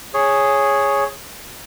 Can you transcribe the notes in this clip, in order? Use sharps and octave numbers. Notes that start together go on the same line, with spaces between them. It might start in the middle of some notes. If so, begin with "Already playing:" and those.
G#4 C#5